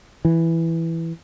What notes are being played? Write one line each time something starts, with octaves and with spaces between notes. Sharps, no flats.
E3